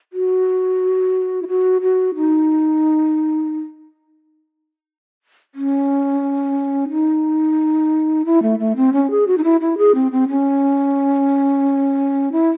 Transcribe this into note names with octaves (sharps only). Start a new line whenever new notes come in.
F#4
E4
F#4
F#4
D#4
C#4
D#4
E4
A3
A3
C4
C#4
G#4
F#4
D#4
E4
E4
G#4
C4
C4
C#4
E4